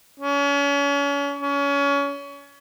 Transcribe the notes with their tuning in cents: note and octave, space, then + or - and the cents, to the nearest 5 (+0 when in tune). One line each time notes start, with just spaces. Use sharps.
C#4 +35
C#4 +30